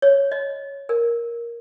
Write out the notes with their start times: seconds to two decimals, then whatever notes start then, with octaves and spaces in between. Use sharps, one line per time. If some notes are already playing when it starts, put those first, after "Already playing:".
0.02 C#5
0.32 D#5
0.89 A#4